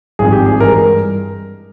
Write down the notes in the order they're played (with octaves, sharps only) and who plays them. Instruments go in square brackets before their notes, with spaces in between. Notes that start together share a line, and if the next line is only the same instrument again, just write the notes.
[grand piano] G#1 G2 F3 C4 G#4
G4
G#4
G2 E3 G#3 A#4